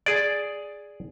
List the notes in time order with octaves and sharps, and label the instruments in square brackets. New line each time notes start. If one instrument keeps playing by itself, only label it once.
[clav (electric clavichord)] G#4 D5